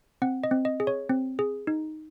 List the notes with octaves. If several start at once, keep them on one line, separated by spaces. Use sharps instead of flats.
C4 F#5
D#5
C4
D#5
G#4
C#5
C4
G#4
D#4